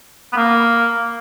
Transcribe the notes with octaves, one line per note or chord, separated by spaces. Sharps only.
B3
A#3